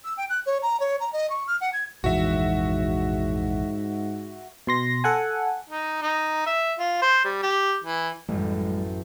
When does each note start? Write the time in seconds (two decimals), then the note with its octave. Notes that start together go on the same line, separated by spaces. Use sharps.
0.04 E6
0.17 G5
0.29 F#6
0.46 C#5
0.62 A#5
0.80 C#5
1.00 A#5
1.13 D#5
1.30 C#6
1.47 F6
1.61 F#5
1.73 G#6
2.04 A#1 F2 G#2 E3 F#4 E5
4.67 B2 C6 A#6
5.04 A4 F#5 G#5
5.70 D#4
6.02 D#4
6.46 E5
6.79 F4
7.02 C5
7.25 G3
7.42 G4
7.84 E3
8.29 A1 F#2 G3 G#3